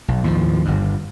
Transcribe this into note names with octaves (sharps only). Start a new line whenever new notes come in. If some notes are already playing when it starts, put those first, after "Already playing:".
B1
D#2 A2 E3 F3
G1 G2